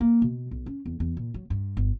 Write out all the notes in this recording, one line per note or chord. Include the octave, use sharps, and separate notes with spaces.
A#3
B2
B1
C#4
E2
E2
A#2
F#3
G2
G1